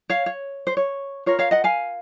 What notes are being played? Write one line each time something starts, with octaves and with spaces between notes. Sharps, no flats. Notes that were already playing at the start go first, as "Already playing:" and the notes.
C#5 F5
C#5
C5
C#5
F4 A#4 C#5
C#5 F5
D#5 F#5
F5 G#5